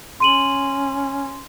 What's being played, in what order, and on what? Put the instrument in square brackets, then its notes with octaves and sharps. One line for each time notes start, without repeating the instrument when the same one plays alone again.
[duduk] C#4 [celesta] C6 D#7 F#7